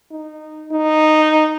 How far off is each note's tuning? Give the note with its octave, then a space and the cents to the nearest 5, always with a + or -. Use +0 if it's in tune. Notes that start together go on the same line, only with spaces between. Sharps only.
D#4 -15
D#4 -10